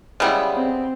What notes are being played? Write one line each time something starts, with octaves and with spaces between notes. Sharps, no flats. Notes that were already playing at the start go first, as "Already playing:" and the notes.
C#3 G3 G#3 B3 E4
C4